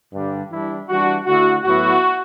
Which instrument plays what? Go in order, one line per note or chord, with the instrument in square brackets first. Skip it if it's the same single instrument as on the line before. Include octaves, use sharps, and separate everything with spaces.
[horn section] G2 D3 G3 D4
E3 G3 D4 E4
E3 G3 D4 F#4
D3 A3 E4 F#4
A2 F#3 B3 E4 F#4